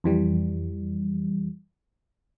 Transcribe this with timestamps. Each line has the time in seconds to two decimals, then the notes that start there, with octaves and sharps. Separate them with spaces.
0.04 F2 E3 G3